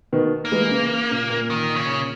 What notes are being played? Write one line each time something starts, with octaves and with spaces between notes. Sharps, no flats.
B2 D#3
A#3
E3 G#3
C#3 E3
A#2 C#3
A#2
D#3
C#3